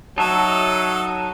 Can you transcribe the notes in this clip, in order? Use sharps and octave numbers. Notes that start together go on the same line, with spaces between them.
F#3 D#4 A4 E5 A5